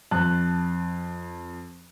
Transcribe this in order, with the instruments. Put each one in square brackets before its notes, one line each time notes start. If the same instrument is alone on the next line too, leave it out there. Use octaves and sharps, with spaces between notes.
[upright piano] F2 A5 F#6